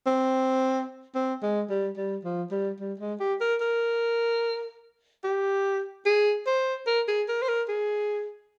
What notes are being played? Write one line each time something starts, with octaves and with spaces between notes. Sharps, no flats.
C4
C4
G#3
G3
G3
F3
G3
G3
G#3
G4
A#4
A#4
G4
G#4
C5
A#4
G#4
A#4
C5
A#4
G#4